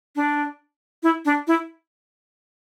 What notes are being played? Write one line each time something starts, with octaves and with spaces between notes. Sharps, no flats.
D4
E4
D4
E4